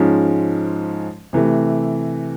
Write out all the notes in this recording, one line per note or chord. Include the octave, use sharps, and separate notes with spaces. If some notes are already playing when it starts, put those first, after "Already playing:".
Already playing: G#2 F3 G#3 C#4
C3 E3 A3